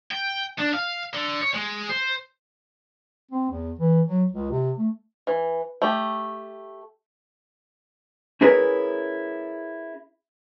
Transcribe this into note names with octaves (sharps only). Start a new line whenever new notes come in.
G5
D4
F5
D3
C#5
G#3
C5
C4
E2
E3
F#3
C#2
C3
A3
E3
A3 G4
C#4 E4 G#4 A#4 B4 C#5